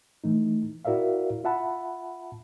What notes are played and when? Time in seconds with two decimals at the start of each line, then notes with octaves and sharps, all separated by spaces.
0.24 E3 A3 D#4
0.85 E4 F#4 A#4 D5 E5 F5
1.44 F4 E5 F#5 A5 B5